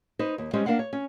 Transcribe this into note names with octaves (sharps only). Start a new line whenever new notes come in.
D#4 B4 C5
D#2
G3 G#3 C4 C#4 C5
A#3 D4 A#4 F5 F#5
C#5
C#4